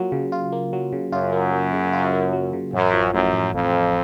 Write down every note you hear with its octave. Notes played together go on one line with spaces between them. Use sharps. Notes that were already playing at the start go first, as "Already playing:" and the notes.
Already playing: F#3 A#3 F4
C#3
F4
A#3
F#3
C#3
F#2 F4
A#3
F#3
C#3
F4
A#3
F#3
C#3
A1 F#2
F3
F#2 A2
A1
A1 F2
F3